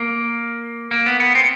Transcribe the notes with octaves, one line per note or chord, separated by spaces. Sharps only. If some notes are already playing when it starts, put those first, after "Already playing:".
Already playing: A#3
A#3
B3
B3
C4